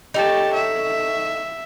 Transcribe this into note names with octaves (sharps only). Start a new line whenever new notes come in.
D#4 G4 A4 C#5 A5
E5